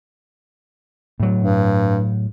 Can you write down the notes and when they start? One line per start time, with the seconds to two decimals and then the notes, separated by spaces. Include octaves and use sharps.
1.20 A2 F#3
1.43 G2